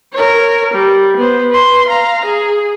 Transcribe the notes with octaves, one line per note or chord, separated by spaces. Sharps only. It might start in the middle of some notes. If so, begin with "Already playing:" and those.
A#4 C#5
G3
B3 C5
B4 C6
F5 A#5
G#4